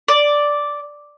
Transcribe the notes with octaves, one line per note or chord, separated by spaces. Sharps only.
D5